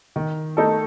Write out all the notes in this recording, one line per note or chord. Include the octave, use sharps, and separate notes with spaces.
D#3
A3 D#4 A4